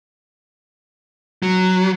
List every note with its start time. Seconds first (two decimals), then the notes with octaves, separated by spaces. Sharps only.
1.43 F#3